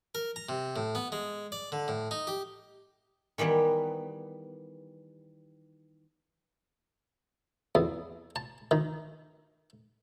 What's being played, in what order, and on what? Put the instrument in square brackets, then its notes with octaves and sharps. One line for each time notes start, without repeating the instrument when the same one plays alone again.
[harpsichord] A#4
A#5
C3
A2
B3
G#3
D5
D3
A2
D#4
G4
[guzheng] D#3 E3 G3 B3
[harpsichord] E2
A5
D#3